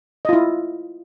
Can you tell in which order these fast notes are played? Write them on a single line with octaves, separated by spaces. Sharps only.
D#5 F4 E4